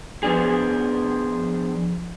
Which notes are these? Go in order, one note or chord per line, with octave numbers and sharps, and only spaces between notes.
F3 B3 D4 G#4